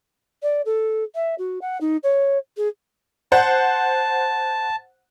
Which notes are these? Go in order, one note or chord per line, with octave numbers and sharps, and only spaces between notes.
D5
A4
E5
F#4
F#5
D#4
C#5
G#4
C5 F#5 A5